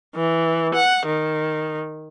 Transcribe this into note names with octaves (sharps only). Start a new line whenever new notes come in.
E3
F#5
D#3